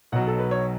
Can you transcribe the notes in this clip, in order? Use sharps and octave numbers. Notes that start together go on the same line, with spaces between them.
B1 B2 F#3 F#5
A4
B4
C#5